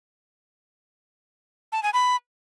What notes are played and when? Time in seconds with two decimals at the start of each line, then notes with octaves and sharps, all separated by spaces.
1.72 A5
1.83 G#5
1.94 B5